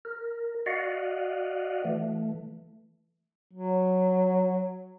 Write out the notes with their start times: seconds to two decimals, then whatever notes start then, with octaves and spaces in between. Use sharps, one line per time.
0.05 A#4
0.66 F#4 D5 D#5 F5 F#5
1.84 E3 A3
3.53 F#3